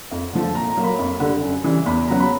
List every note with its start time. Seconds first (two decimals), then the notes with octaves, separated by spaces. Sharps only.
0.11 F2
0.33 D3 F3 A3
0.55 A#2 A#5
0.70 A#5
0.77 F#3 A#3
0.84 B5
0.99 F2
1.20 D3 G3
1.42 F#2
1.64 C#3 E3 G3
1.86 E2 B5
2.08 C#3 F#3 B3 A#5
2.20 B5